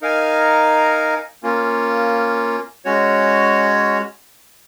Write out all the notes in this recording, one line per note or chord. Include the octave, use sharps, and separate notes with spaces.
D#4 A#4 F5 G#5
A#3 C#4 F4
G#3 C#4 F#4 C#5